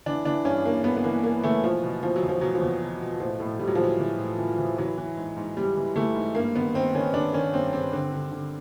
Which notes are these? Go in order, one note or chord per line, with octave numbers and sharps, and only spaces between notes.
E3 D4
E3 D4
G2 C#4
G2 A#3
G2 B3
B3
E3 A#3
E3 A#3
E3 A3
B2 F3
B2
B2 F3
F#3
E2
F3
B2 F#3
F3
E2
B2
B2
A2 F3
A2
A2 G3
F#3
F3
E3 F#3
E3
A2
E3
E3
E3 F#3
E3
G#2
G#2
G#2 G3
E3
E3 A3
G#2
G2 A#3
D#3 B3
D#3 C4
D#3 C#4
D#3 D4
D#3 C#4
G2 C4
G2 C4
D3 C4
D3
D3